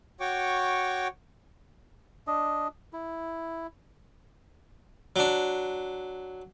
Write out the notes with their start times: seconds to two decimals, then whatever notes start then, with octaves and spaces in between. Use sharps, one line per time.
0.20 F#4 C#5 G5 C#6 D6
2.27 D4 D#5
2.93 E4
5.16 F#3 D4